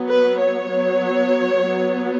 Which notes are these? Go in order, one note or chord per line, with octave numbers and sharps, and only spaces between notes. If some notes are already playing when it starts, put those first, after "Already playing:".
Already playing: F#3 B3
B4
C#5
F#3 B3
F#3 B3